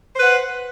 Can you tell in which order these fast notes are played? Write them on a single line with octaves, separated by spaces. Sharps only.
C5 B4 F#5